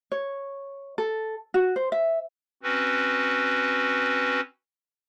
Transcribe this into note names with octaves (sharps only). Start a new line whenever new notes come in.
C#5
A4
F#4
C5
E5
C4 C#4 F#4 B4